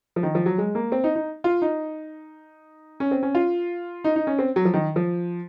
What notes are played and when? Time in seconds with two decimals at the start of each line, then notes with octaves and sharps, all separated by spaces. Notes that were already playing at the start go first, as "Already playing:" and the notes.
0.16 F3
0.23 D#3
0.35 F3
0.46 F#3
0.58 G#3
0.75 A#3
0.92 C4
1.04 D#4
1.15 D#4
1.44 F4
1.62 D#4
3.00 C#4
3.11 C4
3.23 C#4
3.35 F4
4.04 D#4
4.16 D#4
4.27 C#4
4.39 C4
4.56 F#3
4.65 F3
4.74 D#3
4.96 F3